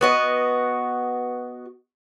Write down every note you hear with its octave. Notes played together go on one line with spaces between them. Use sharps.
B3 F#4 D#5